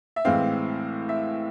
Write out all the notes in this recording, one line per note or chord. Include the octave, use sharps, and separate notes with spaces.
E5
A2 E3 G#3 C4 F5
E5